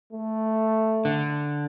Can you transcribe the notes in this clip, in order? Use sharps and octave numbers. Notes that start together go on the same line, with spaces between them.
A3
D3